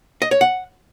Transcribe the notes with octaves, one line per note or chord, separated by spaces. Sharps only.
D#5
C#5
F#5